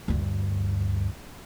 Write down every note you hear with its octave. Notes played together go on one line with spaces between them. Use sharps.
D2 G2